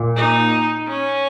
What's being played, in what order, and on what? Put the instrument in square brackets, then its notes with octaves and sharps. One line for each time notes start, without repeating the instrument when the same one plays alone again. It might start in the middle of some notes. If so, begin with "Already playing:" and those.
Already playing: [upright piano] A#2
[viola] D#4
C#4